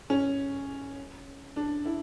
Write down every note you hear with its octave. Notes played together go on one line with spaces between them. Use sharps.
C#4
D4
E4